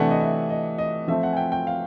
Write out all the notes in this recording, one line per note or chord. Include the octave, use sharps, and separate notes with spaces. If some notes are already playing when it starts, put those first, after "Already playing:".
Already playing: C3 E3 A3 D4 F#5
D#5
E5
D#5
D#5
F3 A3 C4 E5
F#5
G#5
G5
G5
F5